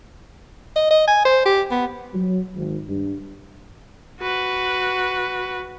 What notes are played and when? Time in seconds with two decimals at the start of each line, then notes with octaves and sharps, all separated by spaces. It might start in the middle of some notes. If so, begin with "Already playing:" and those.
0.76 D#5
0.91 D#5
1.08 G#5
1.25 C5
1.46 G4
1.71 B3
2.14 F#3
2.55 G#1
2.87 G2
4.20 F#4 B4